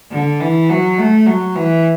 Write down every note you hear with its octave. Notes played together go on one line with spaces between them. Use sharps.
D3
E3
F#3
A3
F#3
E3